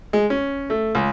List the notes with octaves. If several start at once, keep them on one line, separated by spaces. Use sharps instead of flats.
G#3
C#4
A3
C#2